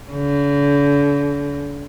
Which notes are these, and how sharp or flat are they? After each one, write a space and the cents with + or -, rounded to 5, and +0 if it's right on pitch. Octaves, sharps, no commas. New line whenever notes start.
D3 -45